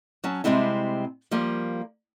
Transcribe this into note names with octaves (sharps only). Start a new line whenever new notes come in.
F#3 C#4 A5
C3 D#3 G3 G#3 C4 E4
F3 G3 A#3